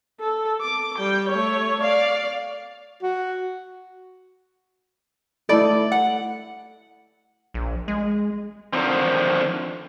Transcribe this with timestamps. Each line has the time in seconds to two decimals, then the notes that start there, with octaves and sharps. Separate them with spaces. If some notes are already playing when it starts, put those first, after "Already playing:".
0.20 A4
0.61 D6
0.98 G3 G5
1.29 A3 C#5
1.81 D5 F5
3.03 F#4
5.49 A3 D#4 E4 A4 D5 B5
5.92 F#5
7.54 A#1
7.88 G#3
8.73 D3 D#3 F3 C4